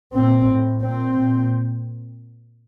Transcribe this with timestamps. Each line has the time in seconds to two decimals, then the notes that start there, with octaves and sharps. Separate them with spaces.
0.14 A#2 C4
0.48 A2
0.82 A#2 C4
1.17 A#2